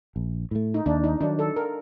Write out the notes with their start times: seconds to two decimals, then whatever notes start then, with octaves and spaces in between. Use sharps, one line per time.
0.16 A#1
0.51 A2 A3
0.74 D#4
0.86 D#2 D4
1.04 D#4
1.21 D#3 F#3 D4
1.39 A4
1.56 A#4